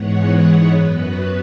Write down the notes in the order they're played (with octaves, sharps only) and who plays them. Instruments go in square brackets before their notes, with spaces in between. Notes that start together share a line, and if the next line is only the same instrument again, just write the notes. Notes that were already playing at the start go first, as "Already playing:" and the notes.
Already playing: [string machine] G#2 E3 G#3 B3 C#5 F#5
C#5 F#5
F#2 F#3 B3 B4